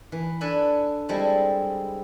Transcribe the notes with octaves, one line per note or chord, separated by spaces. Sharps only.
E3
D4 A4 B4 G#5 B5
G3 G#3 C4 E4 A4